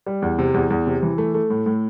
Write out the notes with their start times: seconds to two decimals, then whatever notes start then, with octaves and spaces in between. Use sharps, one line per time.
0.06 G3
0.22 E2
0.39 C3
0.54 E2
0.70 E2
0.87 C3
1.03 E3
1.18 A3
1.34 A3
1.50 A2
1.66 A2